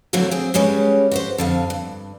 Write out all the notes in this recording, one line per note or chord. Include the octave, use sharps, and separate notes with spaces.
D3 E3 F#3 A3 A#3 C4
C4 G#4
C#3 G3 G#3 C#4 B4
F#4 B4 C5
F2 D3 F5
G2